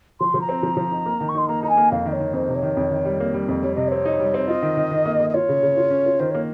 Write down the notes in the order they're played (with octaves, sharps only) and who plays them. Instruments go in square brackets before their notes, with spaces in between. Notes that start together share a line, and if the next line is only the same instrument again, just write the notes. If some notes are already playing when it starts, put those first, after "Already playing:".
[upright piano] F3 [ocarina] C6
[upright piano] F3
[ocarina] A#5
[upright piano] C4
F3
F3
D#4
A#3
D#3
[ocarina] C#6
[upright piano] D#4 [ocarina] C6
[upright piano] A#3 [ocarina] A#5
[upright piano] D#4 [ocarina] A#5
[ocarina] G#5
[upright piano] A#3
[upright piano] F2 [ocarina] F5
[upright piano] D#3 [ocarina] D#5
[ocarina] C#5
[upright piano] D#3
[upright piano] F2 [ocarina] C5
[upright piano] C3
[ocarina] C#5
[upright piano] D#3
F2
D#3
G3
A#3
G3
F2
[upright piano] G3 [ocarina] C#5
[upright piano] C3 [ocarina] D#5
[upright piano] C4 [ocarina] C#5
[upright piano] D#4
G3
C4
[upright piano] F4 [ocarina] D#5
[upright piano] D#3
D#3
D#3
A#3
A#3
[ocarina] D#5
[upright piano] F4 [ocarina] C#5
[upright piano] C#3
C#3
F4
C#4
F4
[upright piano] D#3 [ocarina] C5
[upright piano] A#3 [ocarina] C#5